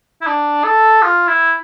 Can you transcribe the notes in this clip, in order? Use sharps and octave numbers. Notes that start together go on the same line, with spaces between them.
E4
D4
A4
F4
E4